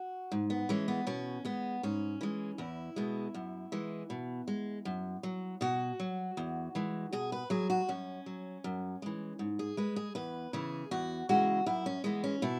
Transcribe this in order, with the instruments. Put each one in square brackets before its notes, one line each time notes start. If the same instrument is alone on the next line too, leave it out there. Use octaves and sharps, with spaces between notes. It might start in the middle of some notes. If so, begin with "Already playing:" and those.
Already playing: [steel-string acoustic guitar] F#4
G#2
B3
E3 G#3 C#4
B3
B2 C#4
G#3 B3
G#2 C#4
E3 G#3
E2 E4
B2 G#3
F#2
E3 G#3
B2
G#3
F#2
F#3
B2 F#4
F#3
E2
E3 G#3
B2 G#4
B4
F#3 G#4
F#4
F#2 C#4
F#3
F#2
E3 G#3
G#2
G#4
G#3 B4
G#4
E2 B4
C#3 E3 G#4
E2 F#4
C#3 E3 G#3 F#4
F#2 E4
C#4
E3 G#3 B3
C#4
B2 E4